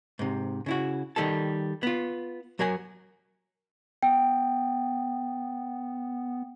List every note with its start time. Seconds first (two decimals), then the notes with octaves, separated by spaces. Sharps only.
0.19 G#2 C3
0.66 C#3 E4 F#4
1.16 D#3 G3 A4 A5
1.83 B3 F4
2.59 F#3 A#4 C#5 G#5
4.03 B3 G5